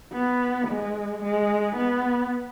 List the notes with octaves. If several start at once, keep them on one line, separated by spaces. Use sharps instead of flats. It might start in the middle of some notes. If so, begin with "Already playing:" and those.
B3
G#3
G#3
B3